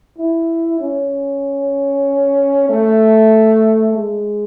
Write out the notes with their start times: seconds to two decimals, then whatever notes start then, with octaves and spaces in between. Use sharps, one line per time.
0.18 E4
0.80 C#4
2.69 A3
3.95 G#3